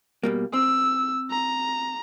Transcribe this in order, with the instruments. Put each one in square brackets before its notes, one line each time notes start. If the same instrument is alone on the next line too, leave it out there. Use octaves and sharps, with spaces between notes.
[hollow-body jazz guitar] B2 G3 A#3
[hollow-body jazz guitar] C4 [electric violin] E6
[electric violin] A#5